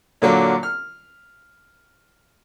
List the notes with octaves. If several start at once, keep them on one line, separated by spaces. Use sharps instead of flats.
A#2 D3 F#3 F4
F6